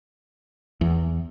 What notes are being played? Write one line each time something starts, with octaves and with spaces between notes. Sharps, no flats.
E2